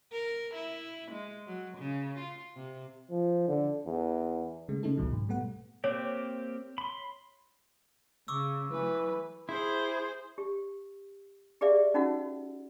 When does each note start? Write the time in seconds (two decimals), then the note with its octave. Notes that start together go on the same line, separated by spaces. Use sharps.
0.12 A#4
0.55 E4
1.12 G#3
1.46 F#3
1.78 C#3
2.19 F4
2.55 C3
3.11 F3
3.48 D3
3.86 E2
4.69 C#3 G#3 A3
4.83 C#3 A3 C#4 D#4 E4 A4
4.97 G#1 C#2 B2 D#3 F#3
5.13 G#2
5.28 B2 G3 A3 B3 F#5
5.84 A#3 C4 G4 C#5
6.78 B5 C6
8.28 C#3 C#6 D6 E6
8.72 E3 F#3 A3 B4
9.49 E4 G#4 C5
10.38 G4
11.61 G4 G#4 B4 D5 E5 F5
11.94 C#4 D#4 F#4 A#4 F#5